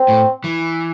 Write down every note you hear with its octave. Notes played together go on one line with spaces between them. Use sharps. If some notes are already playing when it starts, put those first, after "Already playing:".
Already playing: C4
A2
E3